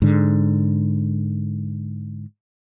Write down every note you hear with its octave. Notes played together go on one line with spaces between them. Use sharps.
G#2 D3